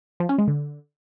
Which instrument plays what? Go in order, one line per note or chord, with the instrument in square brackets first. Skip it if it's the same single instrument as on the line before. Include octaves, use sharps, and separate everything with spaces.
[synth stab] F3
C#4
G#3
D3